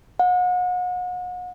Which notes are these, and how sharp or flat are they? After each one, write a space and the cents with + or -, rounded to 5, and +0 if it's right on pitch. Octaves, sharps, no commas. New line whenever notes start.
F#5 -40